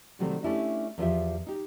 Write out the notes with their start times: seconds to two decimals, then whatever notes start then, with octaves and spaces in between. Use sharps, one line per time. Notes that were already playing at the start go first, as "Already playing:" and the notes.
0.19 C3 D#3 F#3 G3 A3 C4
0.43 A3 C#4 D4 E4 G4 D#5
0.98 E2 F3 F4 G4 E5
1.47 D#4 G4